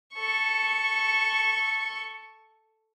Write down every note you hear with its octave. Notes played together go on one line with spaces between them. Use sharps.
A4 C#6